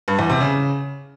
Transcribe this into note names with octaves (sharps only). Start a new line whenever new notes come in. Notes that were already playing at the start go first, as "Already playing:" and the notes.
G2
E2
C3
C#3